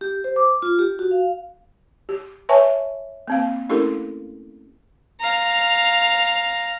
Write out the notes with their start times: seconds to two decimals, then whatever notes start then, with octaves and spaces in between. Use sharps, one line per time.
0.01 G4
0.24 C5
0.36 D6
0.62 F4
0.79 G4
0.99 F#4
1.11 F5
2.09 G4
2.49 B4 C#5 E5 G#5 A5 C#6
3.27 A#3 C4 F5
3.69 A3 C#4 E4 G4 A4 A#4
5.21 F5 A#5